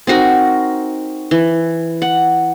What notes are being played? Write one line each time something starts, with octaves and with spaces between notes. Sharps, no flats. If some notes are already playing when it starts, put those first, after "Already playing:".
C4 D#4 F#4 A#4
E3
F#5